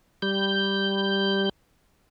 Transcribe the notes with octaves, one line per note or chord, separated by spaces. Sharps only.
G3 G6